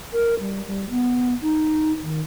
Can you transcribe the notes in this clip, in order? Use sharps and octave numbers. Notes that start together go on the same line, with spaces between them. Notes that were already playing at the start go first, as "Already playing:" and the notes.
A#4
G3
G3
B3
D#4
D#3